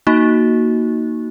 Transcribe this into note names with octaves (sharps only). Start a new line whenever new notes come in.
A#3 D#4 F#4